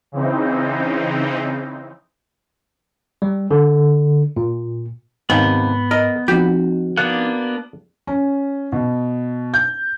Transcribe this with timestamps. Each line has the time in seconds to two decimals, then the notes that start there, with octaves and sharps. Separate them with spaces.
0.12 C#3 E3 C4 D#4
3.22 G3
3.51 D3
4.36 A#2
5.30 D#2 G#2 C3 B3
5.91 A#4 D#5
6.28 F3 C4 D#4 F#4 G4
6.97 A#3 B3 D4 F#5
8.07 C#4
8.72 B2
9.54 G6